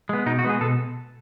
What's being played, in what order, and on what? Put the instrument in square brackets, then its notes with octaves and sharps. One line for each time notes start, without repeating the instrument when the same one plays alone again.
[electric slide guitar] G#3 B3
B2 D#4
F#4
G#3 B3 G#4
B2 A4